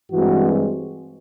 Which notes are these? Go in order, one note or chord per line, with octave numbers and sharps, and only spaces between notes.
G2 E3 G#3 C4 F#4